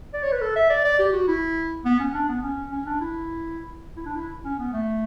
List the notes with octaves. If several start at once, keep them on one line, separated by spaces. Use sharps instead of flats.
D5
C#5
B4
A4
E5
D5
D5
G4
F#4
E4
B3
C#4
D4
B3
C#4
C#4
D4
E4
E4
D4
E4
C#4
B3
A3